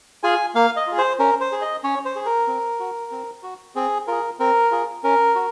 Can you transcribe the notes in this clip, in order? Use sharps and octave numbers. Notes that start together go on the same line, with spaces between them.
F4 G#4 G#5
A#3 F5
D#5
F4 G#4
C5
C#4 A#4
C5
G#4
D#5
C#4 C#5
C5
G#4
A#4
C4
F#4
C4
F#4
C4 G#4
F4 G#4 A#4
C4 A#4
F4 G#4
C#4 A#4
F#4